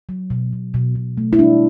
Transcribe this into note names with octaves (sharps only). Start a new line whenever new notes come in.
F#3
B2
B2
B2
B2
A3
E4
G3 D4